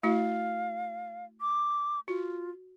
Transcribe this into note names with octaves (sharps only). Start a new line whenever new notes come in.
A3 E4 F#4 F5
D6
F4 F#4